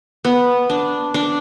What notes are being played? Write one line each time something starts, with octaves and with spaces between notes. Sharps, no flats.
B3
D4
D4